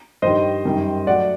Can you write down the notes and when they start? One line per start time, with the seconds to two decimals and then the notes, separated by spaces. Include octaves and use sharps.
0.22 G2 D#3 G3 C5 D#5
0.65 F#2 D#3 G3
1.07 F#3 A3 D5 F#5